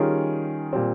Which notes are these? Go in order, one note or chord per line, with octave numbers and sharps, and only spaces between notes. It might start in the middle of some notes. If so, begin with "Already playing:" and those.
Already playing: D#3 G3 C#4 F4 G#4
A#2 G3 C4